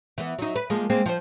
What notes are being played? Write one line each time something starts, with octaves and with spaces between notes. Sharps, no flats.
E3 B3
F#3 D#4
B4
F3 G#3 A#3
G#3 A#3 C4
F3 C5